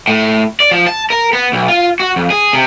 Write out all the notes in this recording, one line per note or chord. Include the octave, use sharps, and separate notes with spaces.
A2
D5
F3
A5
A#4
B3
B1
F4
F#4
F2
G#4
C3